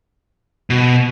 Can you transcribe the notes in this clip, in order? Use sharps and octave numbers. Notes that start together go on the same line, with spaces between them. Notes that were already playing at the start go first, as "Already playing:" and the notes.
B2